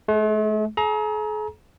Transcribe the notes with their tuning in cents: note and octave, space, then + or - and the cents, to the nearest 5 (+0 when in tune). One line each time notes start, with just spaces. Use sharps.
A3 -45 G#4 +0
G#4 +45 A#5 +20